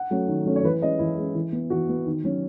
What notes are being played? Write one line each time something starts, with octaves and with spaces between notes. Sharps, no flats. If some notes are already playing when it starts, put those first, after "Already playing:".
Already playing: F#5
F#3 A3 C#4
D#3
F#3 A3 C#4
C#5
E3 B4
G#3 C#4 D#5
E3 E4
G#3 C#4
E3
B3
E3 F#4
B3
D#3
F#3 C#4